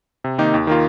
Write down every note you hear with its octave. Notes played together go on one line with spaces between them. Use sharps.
C3
D#3 A#3 D#4 G4
D#2
D#3 A#3 F4